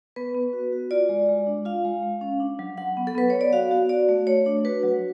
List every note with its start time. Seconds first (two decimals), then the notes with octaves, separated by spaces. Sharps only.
0.16 B3 B4
0.35 B3
0.53 F#4
0.72 F#4
0.91 F4 D5
1.09 G#3
1.29 G#3
1.47 D4
1.65 F4 F5
1.85 G#3
2.03 G#3
2.21 C#4
2.40 D4
2.59 F#3
2.78 F#3 F#5
2.97 B3
3.07 A4
3.15 B3 B4
3.30 B3 C#5
3.41 D5
3.53 F#4 F5
3.71 F#4
3.89 F#4 D5
4.09 A3
4.27 A3 C#5
4.46 D4
4.65 F#4 B4
4.83 F#3